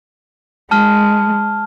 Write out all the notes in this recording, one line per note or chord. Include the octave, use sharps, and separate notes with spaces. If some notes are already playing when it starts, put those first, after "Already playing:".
G#3 A5 F6